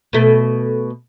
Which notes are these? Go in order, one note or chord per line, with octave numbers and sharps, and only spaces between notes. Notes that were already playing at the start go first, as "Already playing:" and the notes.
B2 A3